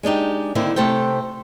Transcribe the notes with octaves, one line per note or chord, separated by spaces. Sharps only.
G#3 D4 D#4 G4
D3 D#3 A#3 C4 E4
C3 A3 A4 C5 G5